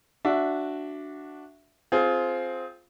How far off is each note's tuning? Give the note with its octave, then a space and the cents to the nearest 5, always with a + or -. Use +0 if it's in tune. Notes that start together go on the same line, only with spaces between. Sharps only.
D4 +0 F#4 +0 E5 +10
C4 +0 F4 +0 G#4 +25